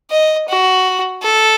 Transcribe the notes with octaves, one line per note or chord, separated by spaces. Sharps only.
D#5
F#4
A4